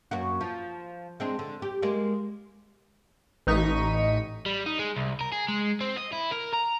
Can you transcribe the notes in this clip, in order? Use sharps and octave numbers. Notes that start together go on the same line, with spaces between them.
F#2 A#3 F#4
F3
G#3 C4 D4
D3
G4
G#3 A#3 D5
A1 D#4 C#6 B6 D#7
G3
D#4
G#3
C2
A#4
G#4
G#3
C4
D#5
E4
A#4
A#5